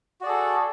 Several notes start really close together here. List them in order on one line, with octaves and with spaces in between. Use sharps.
F#4 D5 G#4 A4